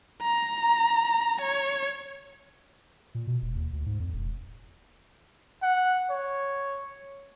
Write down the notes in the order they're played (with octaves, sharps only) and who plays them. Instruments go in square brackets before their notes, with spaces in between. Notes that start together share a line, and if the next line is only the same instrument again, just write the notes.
[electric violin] A#5
C#5
[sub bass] A#2
B2
E1
D#2
D2
G#2
F2
E1
[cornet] F#5
C#5